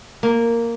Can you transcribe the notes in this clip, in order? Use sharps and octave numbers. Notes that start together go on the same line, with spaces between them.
A#3